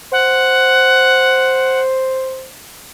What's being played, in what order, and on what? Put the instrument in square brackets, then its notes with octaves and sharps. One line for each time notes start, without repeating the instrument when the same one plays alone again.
[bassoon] C5 [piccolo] F#5